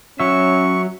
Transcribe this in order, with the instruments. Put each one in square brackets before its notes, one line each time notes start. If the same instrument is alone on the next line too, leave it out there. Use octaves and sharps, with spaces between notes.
[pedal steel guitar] F#3 E5 [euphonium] C#4 [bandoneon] C#6